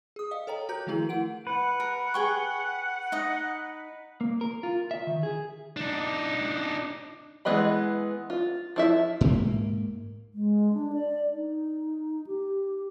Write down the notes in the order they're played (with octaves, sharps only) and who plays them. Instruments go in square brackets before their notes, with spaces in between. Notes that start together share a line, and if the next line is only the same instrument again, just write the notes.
[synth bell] G#4 D#6
D#5 F5
A4 C#5 G5 A#5
F#4 A#4 A#5 G6
D#3 F3 A3 E4 G#4 F#7
E4 F#5 D7
[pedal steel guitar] B4 [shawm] F#5
[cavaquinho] A#4
G#4 G5 C#6
D#4 D#5
[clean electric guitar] A#3
A#4
F4
E5
D#3
G#4
[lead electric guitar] D4 D#4
[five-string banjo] E3 G#3 B3 D#5 B5
F4
F3 E4 E5
[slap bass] G#2 A#3
[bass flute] G#3
D4
D5
D#4
G4